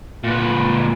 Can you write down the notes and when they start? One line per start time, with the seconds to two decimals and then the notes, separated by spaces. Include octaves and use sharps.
0.24 A#2 B4